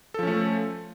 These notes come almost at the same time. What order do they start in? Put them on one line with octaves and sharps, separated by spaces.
A4 F3 C#4 A3